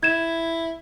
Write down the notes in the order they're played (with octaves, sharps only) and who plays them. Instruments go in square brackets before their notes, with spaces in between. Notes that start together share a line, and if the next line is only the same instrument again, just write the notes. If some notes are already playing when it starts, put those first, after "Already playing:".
[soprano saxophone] E4 [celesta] G#6 E7